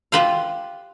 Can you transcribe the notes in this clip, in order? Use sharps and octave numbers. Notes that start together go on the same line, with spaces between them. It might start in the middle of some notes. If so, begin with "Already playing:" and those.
F4 G4 B4 C5 F5